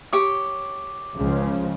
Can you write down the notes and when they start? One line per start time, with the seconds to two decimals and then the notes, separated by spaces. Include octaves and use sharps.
0.13 G4 C#5 D#6
1.15 C#2 C#3 F3